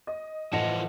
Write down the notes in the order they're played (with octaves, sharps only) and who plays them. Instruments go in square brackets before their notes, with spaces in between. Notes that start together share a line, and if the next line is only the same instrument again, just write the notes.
[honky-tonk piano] D#5
[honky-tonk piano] A2 [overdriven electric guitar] E3 F3 [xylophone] D#5 F#5 A5